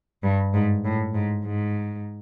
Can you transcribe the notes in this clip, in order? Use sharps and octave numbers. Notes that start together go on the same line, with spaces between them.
G2
G#2
A2
G#2
G#2